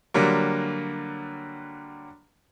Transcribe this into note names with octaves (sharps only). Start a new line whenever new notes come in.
D3 F#3 G3 A#3